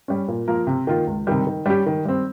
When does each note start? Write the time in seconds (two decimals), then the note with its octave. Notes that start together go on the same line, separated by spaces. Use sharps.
0.08 G3 C#4
0.28 A#2
0.48 F3 A#3 F4 A#4
0.67 C3
0.87 D#3 A#3 F4
1.07 C#2
1.27 C3 D#3 G3
1.47 D#3
1.66 G3 C#4 G4
1.86 D#3
2.05 G3 C4